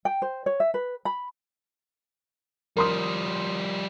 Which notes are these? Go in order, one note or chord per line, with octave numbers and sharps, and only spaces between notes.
G5
C5
C#5
E5
B4
B5
F3 G3 A#4 C6 D#6